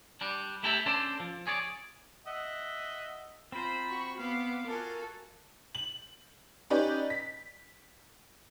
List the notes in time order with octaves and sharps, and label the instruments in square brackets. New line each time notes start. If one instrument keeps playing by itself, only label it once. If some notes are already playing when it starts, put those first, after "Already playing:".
[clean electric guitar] G3 D4
A3 E4 G4 A4 C#5 E5
C#4 D4 A4 C5 D5
F3
G#4 C#5 D5
[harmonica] D#5 E5 F#5
[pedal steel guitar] C4 C5 [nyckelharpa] F4 A#5 [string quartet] B5
[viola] F#4 [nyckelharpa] C#6
[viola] B3 D6 [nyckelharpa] F5
[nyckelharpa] F4 F#4 [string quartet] A4 G#5 [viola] A#4
[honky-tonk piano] F#7
C#4 D#4 G4 B4 D5
B6